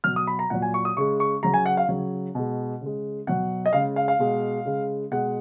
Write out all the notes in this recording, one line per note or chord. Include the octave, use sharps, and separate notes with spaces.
B2 F#3 F6
D#6
B5
A#5
A#2 F#3 F#5
G#5
C#6
D#6
C#3 G#3 C#6
C#6
C#3 F#3 A#5
G#5
F#5
F5
C#3 F#3
B2 G#3
C#3 G#3
B2 F#3 F#5
D#5
C#3 G#3 F5
F5
F5
B2 G#3
C#3 G#3
B2 G#3 F#5